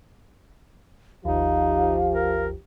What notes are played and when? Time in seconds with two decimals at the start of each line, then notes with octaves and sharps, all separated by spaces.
1.25 G#1 D#2 F3 D#4 G4 F5
2.14 A#4